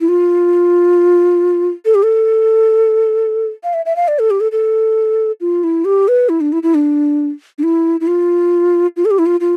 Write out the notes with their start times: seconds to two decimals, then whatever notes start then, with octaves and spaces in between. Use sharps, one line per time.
0.01 E4
0.08 F4
1.85 A4
1.95 G4
2.03 A4
3.64 F5
3.74 E5
3.85 E5
3.96 F5
4.08 D5
4.19 A4
4.31 G4
4.40 A4
4.52 A4
5.41 F4
5.64 E4
5.85 G4
6.08 B4
6.29 E4
6.41 D4
6.52 E4
6.63 E4
6.75 D4
7.58 D4
7.63 E4
8.01 E4
8.07 F4
8.97 F4
9.05 A4
9.11 G4
9.19 E4
9.26 F4
9.40 F4